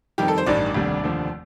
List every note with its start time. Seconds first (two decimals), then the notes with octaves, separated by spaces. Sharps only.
0.18 F2 D#3 G3 G4
0.28 A4
0.38 C5
0.46 A1 G2 D#3 G3 D5
0.74 F1 D#2 D3 G3
1.03 F1 D#2 D3 F3